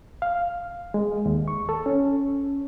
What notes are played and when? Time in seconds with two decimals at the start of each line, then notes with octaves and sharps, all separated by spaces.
0.22 F5
0.94 G#3
1.26 D#2
1.48 C#6
1.69 A4
1.86 C#4